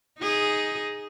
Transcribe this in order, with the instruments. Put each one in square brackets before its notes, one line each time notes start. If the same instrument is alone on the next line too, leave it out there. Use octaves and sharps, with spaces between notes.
[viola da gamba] D#4 G#4